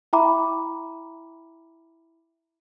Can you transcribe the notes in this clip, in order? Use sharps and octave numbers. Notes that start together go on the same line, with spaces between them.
E4 E5 G5 A#5 B5 D6